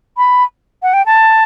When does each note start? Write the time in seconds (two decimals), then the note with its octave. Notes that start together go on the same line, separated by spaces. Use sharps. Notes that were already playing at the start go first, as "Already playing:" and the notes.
0.17 B5
0.83 F#5
0.94 G5
1.06 A5